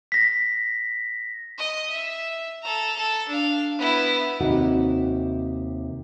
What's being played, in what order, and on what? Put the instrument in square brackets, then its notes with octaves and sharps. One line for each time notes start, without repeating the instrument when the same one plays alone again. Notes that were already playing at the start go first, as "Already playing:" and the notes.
[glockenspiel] A#6 B6
[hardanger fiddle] D#5
E5
A4 A#5
A4
D4 F5
B3 E4
[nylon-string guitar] D#2 C3 D#4 F#4